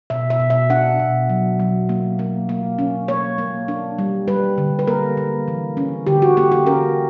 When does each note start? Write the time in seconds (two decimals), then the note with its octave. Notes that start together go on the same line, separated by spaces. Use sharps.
0.10 B2 E5
0.30 E5
0.40 B2
0.50 E5
0.70 D4 F#5
1.00 B2
1.29 F#3
1.60 F#3
1.89 A#3
2.19 A#3
2.49 A#3
2.79 C#4
3.08 A#3 C#5
3.38 A#3
3.68 D4
3.99 G3
4.28 G3 B4
4.58 D3
4.79 B4
4.87 A#3 A#4
5.17 A#3
5.48 E3
5.77 C#4
6.07 D3 G4
6.22 F#4
6.37 A#3 G4
6.52 G4
6.66 C#4 A#4